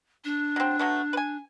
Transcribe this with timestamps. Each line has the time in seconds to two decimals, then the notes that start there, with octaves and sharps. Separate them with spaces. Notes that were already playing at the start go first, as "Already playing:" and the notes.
0.25 D4
0.56 F#3 C4
0.79 F#3 A3 B3
1.13 B4 G#5